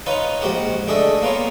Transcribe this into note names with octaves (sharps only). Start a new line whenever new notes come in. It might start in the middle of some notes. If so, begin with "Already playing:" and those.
D#4 F4 B4 C#5
A#1 G#2 F#4 G4 F#5
A3 D4 G#4 D#5 E5
A#3 B3 F4 C#5